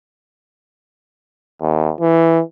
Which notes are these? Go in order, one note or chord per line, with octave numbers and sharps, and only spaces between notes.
D#2
E3